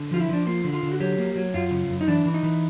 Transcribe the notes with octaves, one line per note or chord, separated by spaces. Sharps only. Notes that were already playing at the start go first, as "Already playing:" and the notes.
Already playing: D3
F3 F4
E4
F3 D4
A#3 F4
D3
F4
D3
F#4
F#3 G4
A#3
F#3
F#2 F4
C#3
F#2
D#4
E3 D4
E3
D#4
E3